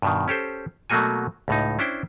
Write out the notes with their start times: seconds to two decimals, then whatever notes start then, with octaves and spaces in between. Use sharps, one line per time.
0.02 G2 B2 D#3
0.28 C#4 G4 A4 C5
0.90 B2 F#3 A3 A#3 F#4 G#5
1.48 C#2 A2 D#4
1.79 C#4 D4 E4 C5 G5